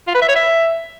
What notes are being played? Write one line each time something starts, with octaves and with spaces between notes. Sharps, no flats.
F4
B4
E5
C#5
E5